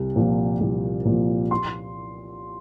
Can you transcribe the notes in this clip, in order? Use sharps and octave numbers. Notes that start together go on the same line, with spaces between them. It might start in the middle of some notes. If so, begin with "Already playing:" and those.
Already playing: C2
A#2 F3
C2
A#2 F3
C6